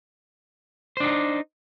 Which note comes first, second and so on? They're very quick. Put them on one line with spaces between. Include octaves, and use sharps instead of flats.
C5 D4 D#4